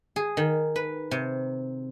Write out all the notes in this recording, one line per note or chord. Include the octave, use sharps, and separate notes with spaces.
G#4
D#3
B4
C3